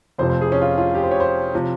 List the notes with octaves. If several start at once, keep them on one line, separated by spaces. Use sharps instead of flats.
F1 F2 C3 F3 C5
C5
G#4
C#4
F4
F4
G4
C5
C#5
C5
C3 F3